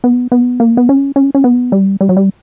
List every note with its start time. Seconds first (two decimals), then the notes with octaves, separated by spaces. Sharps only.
0.04 B3
0.32 B3
0.60 A#3
0.77 B3
0.89 C#4
1.16 C#4
1.35 C#4
1.44 B3
1.72 G3
2.01 G3
2.09 F#3
2.17 G3